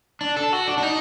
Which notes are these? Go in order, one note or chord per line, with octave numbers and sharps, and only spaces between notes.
D4
A4
F#4
D4
D4
D#4